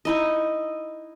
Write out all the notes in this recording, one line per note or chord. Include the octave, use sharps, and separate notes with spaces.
D#4 E4 D#5